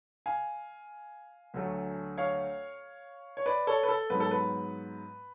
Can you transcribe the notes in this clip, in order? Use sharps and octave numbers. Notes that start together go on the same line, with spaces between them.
F5 G#5
D2 D3 F#3 A3
C#5 F5
C#5
B4 D5
A4 C#5
B4
A4
G#2 F#3 B3 B4
A4
B4